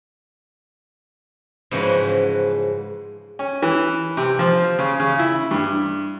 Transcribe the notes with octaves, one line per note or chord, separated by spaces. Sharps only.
G#2 C#3 E3 F3 F#4
C#4
E3
C3
F3
C#3
C#3
E4
G2